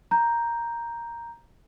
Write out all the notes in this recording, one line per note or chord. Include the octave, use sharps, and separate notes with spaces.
A#5 G6